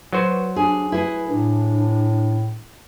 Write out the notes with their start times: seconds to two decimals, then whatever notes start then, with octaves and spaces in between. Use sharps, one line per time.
0.13 F#3 F#4 B4 C5
0.56 D4 G#4
0.92 E4 G#4 B4
1.29 A2 D4